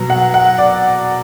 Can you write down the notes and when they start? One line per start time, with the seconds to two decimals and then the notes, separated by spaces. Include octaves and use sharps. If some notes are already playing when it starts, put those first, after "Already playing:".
Already playing: B2 F#3
0.10 F#5
0.34 F#5
0.58 D5